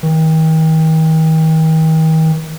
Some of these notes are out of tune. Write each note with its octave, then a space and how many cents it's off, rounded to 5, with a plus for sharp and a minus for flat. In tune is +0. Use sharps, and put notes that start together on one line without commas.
D#3 +40